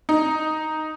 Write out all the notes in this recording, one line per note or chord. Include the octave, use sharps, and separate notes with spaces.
D#4